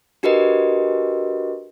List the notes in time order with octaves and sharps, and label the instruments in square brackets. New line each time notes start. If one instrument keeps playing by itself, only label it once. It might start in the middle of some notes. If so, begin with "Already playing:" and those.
[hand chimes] D4 F#4 G4 A#4 B4 D#5